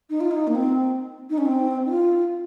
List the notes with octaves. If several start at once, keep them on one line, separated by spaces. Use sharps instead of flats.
D#4
F4
D#4
A#3
C4
D#4
C#4
C4
D#4
F4